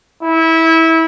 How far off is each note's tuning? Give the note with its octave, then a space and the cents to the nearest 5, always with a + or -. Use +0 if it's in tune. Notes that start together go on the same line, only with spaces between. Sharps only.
E4 -20